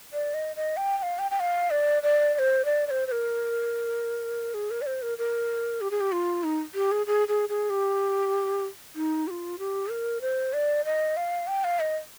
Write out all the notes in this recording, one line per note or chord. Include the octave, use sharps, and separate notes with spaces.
D5
D#5
D#5
G5
G5
F5
G5
G5
F5
D5
D5
D5
C5
D5
D5
C5
C5
A#4
G#4
A#4
D5
C5
A#4
A#4
G4
G#4
G4
F4
D#4
G4
G#4
G#4
G#4
G#4
G4
D#4
G4
F4
G4
A#4
C5
D5
D#5
F5
G5
F5
D#5